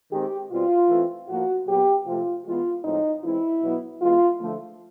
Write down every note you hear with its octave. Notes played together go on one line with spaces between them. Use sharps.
D#3 G#3 C4 G4
B2 G3 C4 F4
E3 A3 C4
A2 F3 A#3 F#4
A#2 F#3 B3 G4
C3 F3 A3 C4 F4
E3 G#3 B3 F4
A2 F3 G#3 C4 D#4
E3 G#3 C4 E4
B2 F#3 B3
E3 G#3 B3 F4
D3 F3 A3